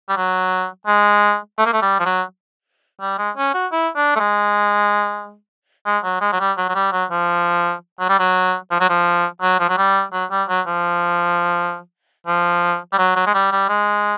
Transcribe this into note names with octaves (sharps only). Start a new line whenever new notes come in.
G3
F#3
G#3
A3
A#3
A3
G3
F3
F#3
G3
G#3
C#4
F#4
E4
D4
A3
G#3
G#3
F#3
G#3
F#3
G3
F#3
F#3
G3
F#3
F3
F#3
G3
F#3
F3
F#3
F3
F#3
F3
F#3
G3
F#3
G3
F#3
F3
F3
G3
F#3
F#3
G#3
G3
G3
G#3